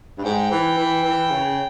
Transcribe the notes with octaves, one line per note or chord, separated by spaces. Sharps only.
G2
G#2 G5
E3
E3
E3
C#3